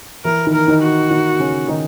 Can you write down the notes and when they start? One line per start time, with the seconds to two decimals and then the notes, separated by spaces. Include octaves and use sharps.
0.25 E3 E4 A#4
0.47 D#3 D#4
0.53 A#4
0.68 D#3 D#4
0.82 F#4
1.10 D#3 D#4
1.39 C#3 C#4
1.68 D#3 D#4